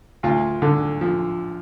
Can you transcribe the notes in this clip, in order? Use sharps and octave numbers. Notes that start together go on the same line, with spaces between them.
D2 F4
D3
F3